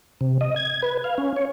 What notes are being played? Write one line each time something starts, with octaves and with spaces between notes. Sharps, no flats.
C3
D#5
G#6
B4
F5
C#4
C#5